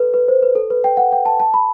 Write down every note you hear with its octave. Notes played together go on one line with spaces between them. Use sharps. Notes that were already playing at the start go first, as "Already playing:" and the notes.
Already playing: A4 B4
B4
C5
B4
A4
B4
G5
F#5
G5
A5
A5
B5